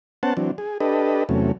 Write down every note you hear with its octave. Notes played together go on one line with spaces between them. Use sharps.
B3 C#4 C5 F#5 A5
E3 F#3 C4 D4
G#4
D4 G4 A4 B4 D#5
E2 C3 F#3 A3 C#4